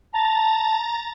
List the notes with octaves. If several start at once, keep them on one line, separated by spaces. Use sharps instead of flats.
A5 A#5 A6